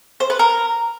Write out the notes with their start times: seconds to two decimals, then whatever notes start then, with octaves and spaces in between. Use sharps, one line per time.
0.20 C5
0.30 B4
0.39 A#4